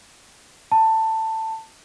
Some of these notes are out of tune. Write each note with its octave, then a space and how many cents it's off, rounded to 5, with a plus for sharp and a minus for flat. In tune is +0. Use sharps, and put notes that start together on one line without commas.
A5 +15